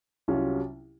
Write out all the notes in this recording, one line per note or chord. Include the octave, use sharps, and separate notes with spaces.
C2 C3 F#3 C#4 F4